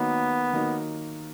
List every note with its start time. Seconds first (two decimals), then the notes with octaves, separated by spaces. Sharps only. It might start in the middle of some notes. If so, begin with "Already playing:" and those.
Already playing: D#3 F#3 A#3 B3 D#4
0.53 D#3 F#3 A#3 D#4